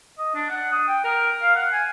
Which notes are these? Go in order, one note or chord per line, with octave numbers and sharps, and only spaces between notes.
D#5
D4
F#5
D#6
G5
A#4
F5
F#5
G#5